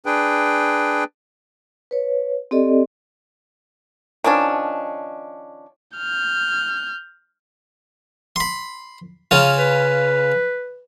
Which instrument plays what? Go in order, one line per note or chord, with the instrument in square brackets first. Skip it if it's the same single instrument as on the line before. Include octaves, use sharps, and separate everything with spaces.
[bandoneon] D4 G#4 B4 G5
[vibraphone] B4 C#5
C4 G4 A4 D5 D#5
[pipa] D#3 F3 C#4 D4
[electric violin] F6 G6
[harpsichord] B5 C6
C#3 C#4 F4
[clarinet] B4